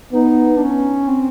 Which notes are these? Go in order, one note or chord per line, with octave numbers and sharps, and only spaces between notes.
B3 D#4
D4
C#4
C4